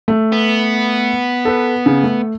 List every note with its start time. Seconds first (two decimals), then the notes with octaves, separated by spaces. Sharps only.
0.08 A3
0.32 B3
1.45 A4 B4
1.86 C#3
2.03 A3